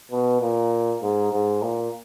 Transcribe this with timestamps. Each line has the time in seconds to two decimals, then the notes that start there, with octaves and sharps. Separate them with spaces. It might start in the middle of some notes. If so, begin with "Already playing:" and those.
0.11 B2
0.41 A#2
1.03 G#2
1.32 G#2
1.62 A#2